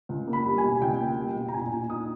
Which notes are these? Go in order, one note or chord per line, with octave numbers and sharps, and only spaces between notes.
C#2
A#3
B5
G3
G#5
B2
C#2 G5
A#3
G3
B2
A#5
A#2 G#5
A#2
D#4 D#6